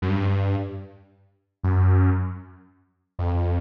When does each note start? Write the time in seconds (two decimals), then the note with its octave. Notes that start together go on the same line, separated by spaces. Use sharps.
0.02 F#2
0.09 G2
1.64 F#2
3.19 F2